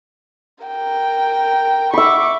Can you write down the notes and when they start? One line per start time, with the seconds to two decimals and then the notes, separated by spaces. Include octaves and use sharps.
0.65 A#4 G5
1.94 E5 B5 C#6 D6